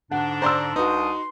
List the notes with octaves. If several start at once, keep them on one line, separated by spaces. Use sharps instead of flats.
G#2 D3 D4 F#5
C5 D5 A#5 C6 E6
C2 D4 D#4 F#4 B4 C6 D#6